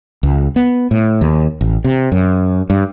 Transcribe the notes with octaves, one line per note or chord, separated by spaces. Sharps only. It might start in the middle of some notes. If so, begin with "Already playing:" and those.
C#2
B3
A2
D#2
A1
C3
F#2
G2